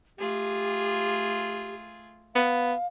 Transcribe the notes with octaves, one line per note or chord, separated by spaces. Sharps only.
A3 F4 G4 G#4
B3 F5